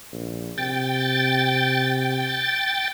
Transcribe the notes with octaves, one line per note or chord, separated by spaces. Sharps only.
A#1
C3 G5 A6